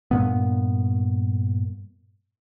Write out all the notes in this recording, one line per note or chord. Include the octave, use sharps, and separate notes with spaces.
G2 A#2 B3